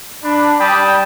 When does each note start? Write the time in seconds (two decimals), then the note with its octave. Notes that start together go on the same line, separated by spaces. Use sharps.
0.24 D4 B5
0.59 G3 D5 G5 A5 B5 D#6